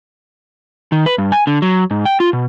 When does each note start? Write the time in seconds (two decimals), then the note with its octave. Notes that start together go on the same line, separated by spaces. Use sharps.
0.92 D#3
1.06 B4
1.18 G2
1.32 G#5
1.47 D3
1.62 F#3
1.91 G#2
2.05 G5
2.20 F4
2.33 B2